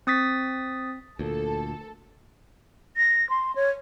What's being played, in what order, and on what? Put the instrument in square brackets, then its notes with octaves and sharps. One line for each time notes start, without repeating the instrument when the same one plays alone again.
[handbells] C4 D#6 A6 B6
[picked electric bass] D2 A#2 [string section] A4
[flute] A#6
C6
C#5